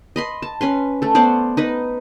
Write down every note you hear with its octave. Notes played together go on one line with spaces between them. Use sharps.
D#5 B5 C6
A5
C#4 B4 C6
A3 A4
B3 C5 D5 F#5
D#4 B4 D#5